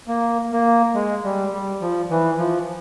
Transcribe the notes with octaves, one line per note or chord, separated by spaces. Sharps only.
A#3
A#3
G#3
G3
G3
F3
E3
F3